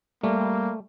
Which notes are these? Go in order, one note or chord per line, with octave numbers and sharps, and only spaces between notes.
G3 A3 A#3